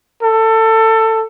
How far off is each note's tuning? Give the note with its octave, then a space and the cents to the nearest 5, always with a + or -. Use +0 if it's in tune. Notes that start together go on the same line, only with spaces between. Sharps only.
A4 +20